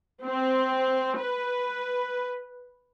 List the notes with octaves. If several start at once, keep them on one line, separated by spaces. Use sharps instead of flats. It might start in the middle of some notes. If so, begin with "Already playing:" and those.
C4
B4